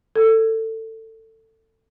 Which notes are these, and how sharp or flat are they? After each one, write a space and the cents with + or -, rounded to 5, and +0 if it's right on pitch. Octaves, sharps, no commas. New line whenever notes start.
A4 +20